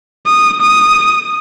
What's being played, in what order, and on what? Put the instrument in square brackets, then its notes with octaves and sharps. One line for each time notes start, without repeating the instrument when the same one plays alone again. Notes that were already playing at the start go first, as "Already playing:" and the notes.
[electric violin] D#6
D#6